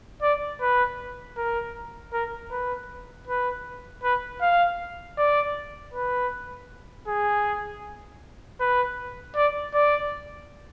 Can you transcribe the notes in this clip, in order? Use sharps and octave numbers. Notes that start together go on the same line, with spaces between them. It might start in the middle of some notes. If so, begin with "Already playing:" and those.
D5
B4
A#4
A#4
B4
B4
B4
F5
D5
B4
G#4
B4
D5
D5